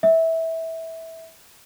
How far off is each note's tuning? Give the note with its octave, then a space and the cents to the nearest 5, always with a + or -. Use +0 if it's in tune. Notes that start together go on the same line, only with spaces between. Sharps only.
E5 -20